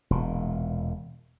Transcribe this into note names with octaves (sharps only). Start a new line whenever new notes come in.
E1 A#2